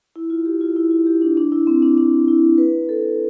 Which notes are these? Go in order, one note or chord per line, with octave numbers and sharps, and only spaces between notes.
E4
F4
G4
F4
E4
F4
G4
D4
D4
E4
C4
D4
D4
E4
B4
A4